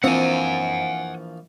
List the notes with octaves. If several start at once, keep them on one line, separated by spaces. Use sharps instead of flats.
A#1 E3 F3 C4 F#5 G#5